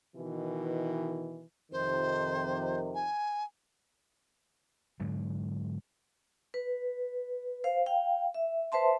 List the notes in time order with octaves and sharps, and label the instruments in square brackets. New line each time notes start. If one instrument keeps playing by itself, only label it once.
[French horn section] B2 D#3 E3
[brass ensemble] F2 C3 D#3 [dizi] C5
[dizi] G#5
[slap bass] G#2 D3 F#3
[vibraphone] B4
C5 F5
F5 G5
E5
B4 C5 E5 A5 C6